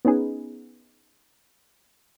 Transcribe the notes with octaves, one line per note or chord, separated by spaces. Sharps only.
B3 C#4 D#4 G#4 B4